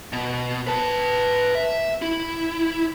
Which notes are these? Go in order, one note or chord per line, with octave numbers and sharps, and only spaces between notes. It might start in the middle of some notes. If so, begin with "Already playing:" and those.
B2
B4 A5
E5
E4